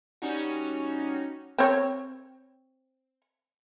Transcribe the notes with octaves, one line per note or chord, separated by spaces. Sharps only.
G3 C#4 D#4 F#4
C4 C#5